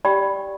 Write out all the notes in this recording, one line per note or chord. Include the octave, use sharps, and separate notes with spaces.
G4 D5 G5 B5